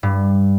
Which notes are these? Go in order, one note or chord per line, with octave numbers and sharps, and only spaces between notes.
G2